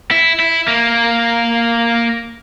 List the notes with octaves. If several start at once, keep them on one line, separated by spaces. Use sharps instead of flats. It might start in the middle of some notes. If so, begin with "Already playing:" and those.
E4
E4
A#3